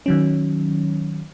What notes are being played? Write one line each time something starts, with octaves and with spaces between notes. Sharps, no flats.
D#3 F#3 C#4